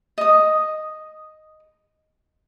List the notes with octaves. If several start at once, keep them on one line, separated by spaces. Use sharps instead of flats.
D#5 D#6